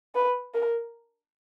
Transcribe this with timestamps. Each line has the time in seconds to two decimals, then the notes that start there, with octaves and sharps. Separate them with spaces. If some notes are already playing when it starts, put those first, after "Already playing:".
0.15 B4
0.54 A#4